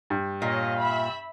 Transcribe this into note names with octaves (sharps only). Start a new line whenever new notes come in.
G2
A#2 C#5 D#5 F5
E5 B5